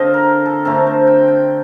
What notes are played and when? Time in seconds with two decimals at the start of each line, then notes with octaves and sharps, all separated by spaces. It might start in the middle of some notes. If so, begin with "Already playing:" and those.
Already playing: D3 C4 D#5 F5
0.14 A#4
0.46 A4
0.65 D3 A3 C4 A#4
0.87 C5
1.07 G5
1.28 G5